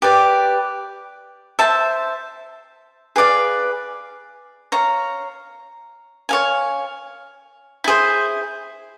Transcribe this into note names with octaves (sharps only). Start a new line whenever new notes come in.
G4 B4 D5
C5 E5 A5
G#4 B4 D5 F5
C#5 F5 A#5
C#5 F5 G#5
E4 G#4 C5